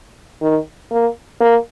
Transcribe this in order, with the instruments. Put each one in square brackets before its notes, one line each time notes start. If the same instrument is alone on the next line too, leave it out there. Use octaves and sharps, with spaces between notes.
[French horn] D#3
A#3
A#3